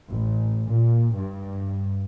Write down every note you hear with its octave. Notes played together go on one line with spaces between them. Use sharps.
A1
A#2
G2